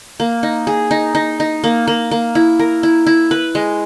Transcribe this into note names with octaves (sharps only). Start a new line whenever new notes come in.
A#3
D#4
G#4
D#4
D#4
D#4
A#3
A#3
A#3
E4
A#4
E4
E4
B4
G#3